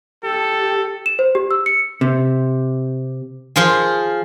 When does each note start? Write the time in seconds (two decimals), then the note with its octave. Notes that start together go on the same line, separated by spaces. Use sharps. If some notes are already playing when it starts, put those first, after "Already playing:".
0.24 G4 A4
1.06 E7
1.19 C5
1.35 G4
1.51 E6
1.66 C#7
2.01 C3
3.56 F3 F4 G#4